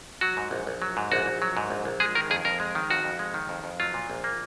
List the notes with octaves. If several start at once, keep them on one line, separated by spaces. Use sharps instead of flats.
F#3 F#4
G#2
A#1
A#1
F#3
G#2
A#1 F#4
A#1
F#3
G#2
A#1
A#1
G#3 G#4
D#3 A#4
F2 G#4
F2 A#4
G#3
D#3
F2 F#4
F2
G#3
D#3
F2
F2
F#3 F4
A#2
A#1
A#3